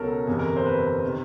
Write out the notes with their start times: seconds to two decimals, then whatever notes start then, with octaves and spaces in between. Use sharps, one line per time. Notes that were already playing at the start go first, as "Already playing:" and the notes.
Already playing: C#2 B2 F#3 A4 A#4
0.27 G1 F2 C3 E3 G#4
0.39 A#4
0.57 C5
0.66 B4
1.05 C3 D#3